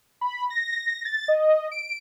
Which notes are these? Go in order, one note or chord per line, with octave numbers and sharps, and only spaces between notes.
B5
A#6
A6
D#5
D7